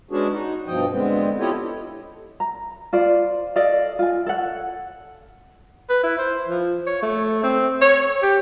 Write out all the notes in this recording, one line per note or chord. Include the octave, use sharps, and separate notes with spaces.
G#3 B3 C#4 D4 F#4 G#4
D#4 F#4
G2 B2 F3 D#5 G5
D3 G#3 B3 C4
E4 F4 G4 A4 C#5 D#5
A#5
F4 C5 D5
A4 D5 D#5 F5
F4 G#5
A4 C#5 F#5
B4
E4
C5
F3
C#5
A3
C4
C#5
G4